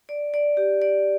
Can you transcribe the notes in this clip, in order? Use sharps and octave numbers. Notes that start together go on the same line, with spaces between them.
D5
D5
G4
D5